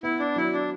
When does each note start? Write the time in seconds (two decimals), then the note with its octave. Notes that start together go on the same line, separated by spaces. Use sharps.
0.03 B3 E4
0.20 D4
0.36 F#3 E4
0.53 D4